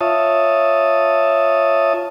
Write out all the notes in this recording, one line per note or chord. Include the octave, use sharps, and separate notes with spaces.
F4 C#5 E5 A5 D#6